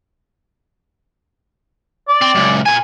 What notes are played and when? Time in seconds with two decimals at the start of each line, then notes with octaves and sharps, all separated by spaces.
2.08 D5
2.21 C4
2.35 C#2 F#2
2.66 A#2 G#5